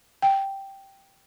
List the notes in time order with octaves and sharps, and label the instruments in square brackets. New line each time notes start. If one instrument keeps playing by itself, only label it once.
[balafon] G5